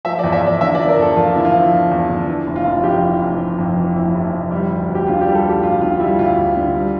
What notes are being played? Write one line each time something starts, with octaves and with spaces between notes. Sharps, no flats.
F3 E5
E2 D5
E5
E2 D5
D3 E5
F3 D5
A#4
E2 A4
E2 F4
D3 E4
F4
F3
E2
E2
D3
E3
F1
F4
F1
F2 G4
E3
F1
F1
F2
E3
F1 E4
F1
F2
G3
D2
D2
G4
D3 F4
G4
G3
A4
D2 G4
D2 F4
D3 F4
G3 E4
D2 F4
D2
D3
G3